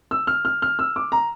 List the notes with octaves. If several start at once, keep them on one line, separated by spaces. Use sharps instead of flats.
E6
F6
F6
F6
E6
D6
A#5